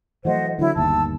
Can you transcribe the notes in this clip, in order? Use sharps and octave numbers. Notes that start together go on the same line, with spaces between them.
E3 F#3 A3 C5 D#5 F#5
D3 F#3 E4
G1 D#2 A5 E6